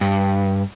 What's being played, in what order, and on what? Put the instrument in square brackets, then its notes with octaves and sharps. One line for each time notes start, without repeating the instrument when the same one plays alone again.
[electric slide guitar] G2